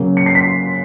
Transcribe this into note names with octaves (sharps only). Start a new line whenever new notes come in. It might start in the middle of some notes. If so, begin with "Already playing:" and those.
Already playing: C#3 F#3 A#3
C#7
C7
B6